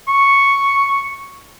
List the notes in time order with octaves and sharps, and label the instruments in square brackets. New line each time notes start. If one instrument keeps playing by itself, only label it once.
[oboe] C#6